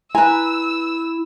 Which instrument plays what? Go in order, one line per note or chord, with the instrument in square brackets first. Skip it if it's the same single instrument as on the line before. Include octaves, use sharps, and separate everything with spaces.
[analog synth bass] E4 [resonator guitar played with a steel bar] B4 G#5 [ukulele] A#5 [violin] E6